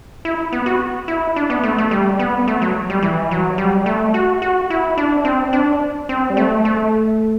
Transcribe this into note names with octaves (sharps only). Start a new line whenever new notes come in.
E4
B3
F#4
E4
D4
B3
A3
A3
G3
B3
A3
F#3
G3
E3
F#3
G3
A3
F#4
F#4
E4
D4
C4
D4
C4
G3
A3
A3